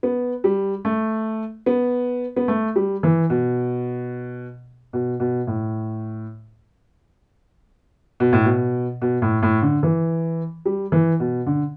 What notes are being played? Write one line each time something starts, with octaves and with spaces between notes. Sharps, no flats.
B3
G3
A3
B3
B3
A3
G3
E3
B2
B2
B2
A2
B2
A2
B2
B2
A2
A2
D3
E3
G3
E3
B2
D3